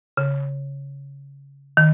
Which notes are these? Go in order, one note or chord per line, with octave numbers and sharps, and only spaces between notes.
C#3
D#3